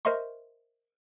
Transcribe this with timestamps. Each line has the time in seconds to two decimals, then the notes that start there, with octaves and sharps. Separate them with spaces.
0.05 A#4 C5 D#5 E5 C6 C#6